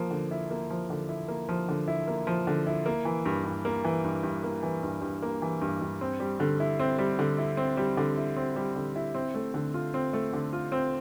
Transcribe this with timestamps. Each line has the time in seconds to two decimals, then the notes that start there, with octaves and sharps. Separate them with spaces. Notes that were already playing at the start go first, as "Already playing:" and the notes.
Already playing: F3 A#3
0.11 D3
0.31 E4
0.51 A#3
0.70 F3
0.90 D3
1.09 E4
1.28 A#3
1.49 F3
1.69 D3
1.88 E4
2.07 A#3
2.27 F3
2.47 D3
2.67 E4
2.86 A#3
3.05 E3
3.26 G2
3.45 G2
3.65 A#3
3.84 E3
4.04 G2
4.23 G2
4.43 A#3
4.63 E3
4.83 G2
5.02 G2
5.22 A#3
5.42 E3
5.62 G2
5.81 G2
6.01 C4
6.20 G3
6.40 D3
6.60 E4
6.79 C4
6.98 G3
7.19 D3
7.38 E4
7.57 C4
7.77 G3
7.97 D3
8.17 E4
8.36 C4
8.56 G3
8.76 D3
8.96 E4
9.15 C4
9.34 A3
9.54 D3
9.74 F4
9.94 C4
10.13 A3
10.33 D3
10.53 F4
10.72 C4